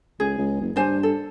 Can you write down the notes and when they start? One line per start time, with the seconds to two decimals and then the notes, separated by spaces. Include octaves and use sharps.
0.20 C#2 G#4
0.38 C#2
0.61 F#1
0.76 G2 D4 C5 G#5
1.03 A4